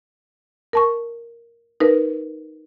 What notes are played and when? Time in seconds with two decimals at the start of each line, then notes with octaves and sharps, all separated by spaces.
0.73 A#4 A5 C#6
1.80 D#4 A#4 B4